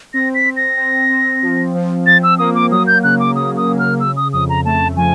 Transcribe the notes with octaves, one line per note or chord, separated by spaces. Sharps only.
C4 A#6
B6
C4
A#6
C4
C4
F3
F3
F3 A6
E6
A#3 D#6
D6
F#3 D#6
G6
C#3 F#6
D6
C#3 D#6
D#6
F#3
F6
C#3 E6
D#6
F2 D#6
A#5
A3 A5
F3 G#5